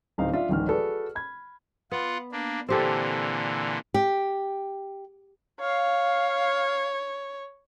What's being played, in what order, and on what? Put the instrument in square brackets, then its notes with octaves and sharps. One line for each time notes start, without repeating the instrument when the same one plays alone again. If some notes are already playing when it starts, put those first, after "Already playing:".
[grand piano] D1 C4 D#4 F5
D4 F4 E5 F5
D1 G#1 D#3 E3 F6
F#4 G#4 A4 B4 D5
B5 G#6
[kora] B3 [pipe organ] F4 F#5
[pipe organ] A#3 D4
[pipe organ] A#2 D3 E3 [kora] C4 G4 A4
[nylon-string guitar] G4
[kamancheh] C#5 [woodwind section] F5